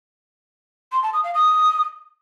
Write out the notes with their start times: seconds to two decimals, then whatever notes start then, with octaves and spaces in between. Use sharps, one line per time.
0.92 C6
1.03 A5
1.13 D#6
1.24 F5
1.34 D#6